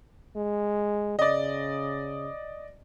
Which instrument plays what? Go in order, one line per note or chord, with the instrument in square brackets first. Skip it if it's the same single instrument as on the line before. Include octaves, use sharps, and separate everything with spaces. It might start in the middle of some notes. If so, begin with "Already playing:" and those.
[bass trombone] G#3
[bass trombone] C#3 [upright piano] D5 D#5